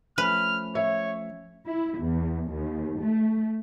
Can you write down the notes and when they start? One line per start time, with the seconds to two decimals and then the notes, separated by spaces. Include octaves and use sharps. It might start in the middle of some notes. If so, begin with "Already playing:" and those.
0.18 F3 A3 C#4 B4 F6
0.75 C#5 E5
1.66 E4
1.99 E2
2.50 D#2
3.00 A3